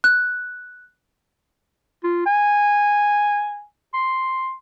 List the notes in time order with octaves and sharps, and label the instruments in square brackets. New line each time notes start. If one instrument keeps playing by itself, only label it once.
[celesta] F#6
[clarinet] F4
G#5
C6